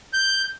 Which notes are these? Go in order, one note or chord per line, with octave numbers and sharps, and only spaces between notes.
G6